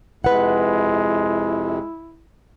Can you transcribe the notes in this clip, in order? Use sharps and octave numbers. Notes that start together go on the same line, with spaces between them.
F2 C3 G#3 E4 B4 F#5